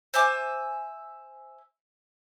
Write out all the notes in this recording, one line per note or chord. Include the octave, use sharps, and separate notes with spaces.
C5 E5 G#5 D6